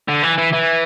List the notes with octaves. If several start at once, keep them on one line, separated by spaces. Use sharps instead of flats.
D3
E3
E3
E3